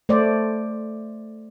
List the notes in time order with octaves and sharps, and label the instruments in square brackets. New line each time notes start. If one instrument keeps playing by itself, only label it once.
[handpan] A3 C5 D5